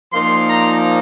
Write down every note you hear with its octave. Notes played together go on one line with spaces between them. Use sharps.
A#2 F3 A#3 D#4 C6
A#5